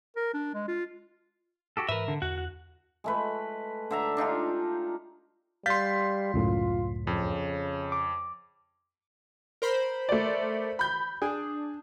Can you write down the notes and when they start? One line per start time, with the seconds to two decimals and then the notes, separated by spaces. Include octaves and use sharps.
0.16 A#4
0.34 D4
0.54 G#3
0.68 F4
1.77 F#4 G4 A4
1.89 G#2 E3 A#4 B4 E5
2.08 D3
2.22 E2 F#4 F#5
2.38 F#5
3.04 G#3 A3 B4
3.91 D3 E5 A#5
4.17 D4 D#4 F4 G4
5.66 G3 F5 C6 G6 A6 B6
6.34 C#2 F#2 A2 F4
7.07 F2 C#3
7.92 D6
9.62 A#4 C5 B5
10.09 A3 D5
10.79 B5 G6
11.22 D4 G#4